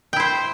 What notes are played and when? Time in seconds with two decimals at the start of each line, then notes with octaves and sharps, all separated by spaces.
0.13 G5
0.16 E4
0.20 C5